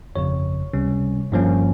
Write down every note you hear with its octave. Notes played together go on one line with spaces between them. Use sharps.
G1 F2 C#3 C#5
C#2 C3 G3 C#4
G1 G2 F3 A#3 C#4